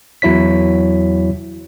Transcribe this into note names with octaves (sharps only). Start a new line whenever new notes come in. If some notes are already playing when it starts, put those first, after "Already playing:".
E2 F#3 E4 C#5 B6